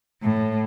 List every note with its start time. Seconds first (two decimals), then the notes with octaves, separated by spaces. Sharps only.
0.23 A2